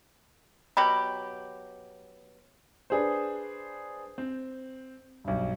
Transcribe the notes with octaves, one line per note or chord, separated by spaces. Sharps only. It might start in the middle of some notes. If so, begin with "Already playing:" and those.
B2 F#3 G4 B5
D4 G#4 B4 C5
C4
B1 G2